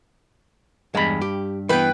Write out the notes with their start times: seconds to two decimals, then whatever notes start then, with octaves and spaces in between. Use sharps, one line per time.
0.95 E2 G2 G#3 B5
1.21 G4
1.69 E3 B3 B4 G5